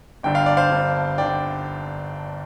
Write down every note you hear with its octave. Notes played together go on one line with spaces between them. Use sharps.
G1 G2 D3 G5
F5
D5
C5 F5
G1 G2 D3
D3 D5 G5